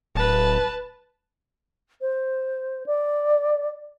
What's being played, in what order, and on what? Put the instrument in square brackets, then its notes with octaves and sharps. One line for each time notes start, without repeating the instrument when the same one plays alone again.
[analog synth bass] D1 [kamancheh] B4 A5
[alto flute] C5
D5